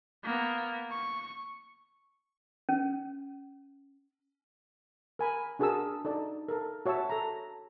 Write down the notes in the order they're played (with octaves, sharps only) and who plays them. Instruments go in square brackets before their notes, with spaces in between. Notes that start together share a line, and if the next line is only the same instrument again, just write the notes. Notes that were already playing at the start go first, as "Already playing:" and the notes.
[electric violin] A#3 B3
C#6
[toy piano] C#4
[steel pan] A#4 G#5 B5
D4 F#4 G#4 A#4 A5 E6
D#4 A4 D5
A4 A#4
F#4 C#5 E5 A5 E6
A4 A#5